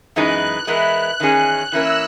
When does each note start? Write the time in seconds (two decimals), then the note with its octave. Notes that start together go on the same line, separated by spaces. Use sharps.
0.15 F#2 E3 G#3 B3 D#4 F#6
0.67 E3 G#3 B3 E4 A#4 F#6
1.20 E2 D#3 F#3 C#4 G#4
1.72 E3 A#3 C#4 E4 A#4 E6